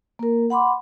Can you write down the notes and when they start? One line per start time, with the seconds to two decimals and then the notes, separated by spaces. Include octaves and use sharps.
0.19 A#3 A#4
0.50 F#5 B5 C6 D6